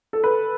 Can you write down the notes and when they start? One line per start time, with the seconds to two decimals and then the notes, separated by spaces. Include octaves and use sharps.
0.13 A4
0.24 B4